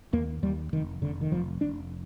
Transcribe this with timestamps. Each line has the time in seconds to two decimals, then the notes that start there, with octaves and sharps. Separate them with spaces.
0.13 D#2 A#3
0.42 D#2 G3
0.73 F1 D#3
1.02 F1 D3
1.21 D#3
1.31 F1 F3
1.61 F1 D4